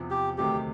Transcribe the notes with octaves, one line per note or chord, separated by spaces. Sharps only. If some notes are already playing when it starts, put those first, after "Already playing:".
Already playing: E2 C3 F3
G4
D2 C3 D#3 F#3 A3 G4